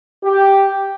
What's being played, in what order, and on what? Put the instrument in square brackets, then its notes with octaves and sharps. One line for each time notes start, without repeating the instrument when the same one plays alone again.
[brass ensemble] G4